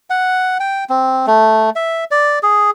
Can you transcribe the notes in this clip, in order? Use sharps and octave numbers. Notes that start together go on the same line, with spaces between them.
F#5
G5
C4
A3
E5
D5
G#4